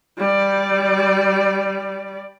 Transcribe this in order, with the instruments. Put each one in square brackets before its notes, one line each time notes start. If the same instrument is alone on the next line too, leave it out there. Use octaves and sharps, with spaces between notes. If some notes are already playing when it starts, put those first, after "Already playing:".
[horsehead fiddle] G3 D5